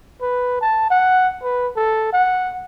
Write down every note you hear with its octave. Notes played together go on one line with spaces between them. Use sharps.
B4
A5
F#5
B4
A4
F#5